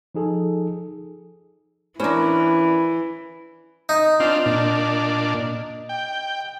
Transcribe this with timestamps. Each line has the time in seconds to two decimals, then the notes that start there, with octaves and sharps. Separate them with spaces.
0.15 F3 D#4 G#4 A4
2.00 E3 C#4 D4 A#4 C5 B5
3.89 D#4
4.20 C4 D4 F4
4.46 A#2 D4
5.89 G5